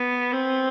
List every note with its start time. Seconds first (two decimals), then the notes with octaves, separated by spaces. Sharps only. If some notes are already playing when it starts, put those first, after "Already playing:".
Already playing: B3
0.33 C4